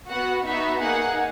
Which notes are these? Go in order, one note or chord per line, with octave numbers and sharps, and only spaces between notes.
B3 F#4 F#5
B3 D#4 F#4 E5
A#3 D#4 G#4 F#5